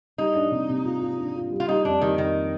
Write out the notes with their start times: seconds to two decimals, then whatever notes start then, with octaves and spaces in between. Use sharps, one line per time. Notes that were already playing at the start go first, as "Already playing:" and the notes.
0.18 G3 D#4
0.35 D4
0.51 C3
0.69 C3
0.85 F4
1.01 F4
1.18 D4
1.35 F4
1.51 G3
1.60 F4
1.68 G3 D#4
1.85 F2 D4
2.01 D#3 G3
2.18 F2 D#3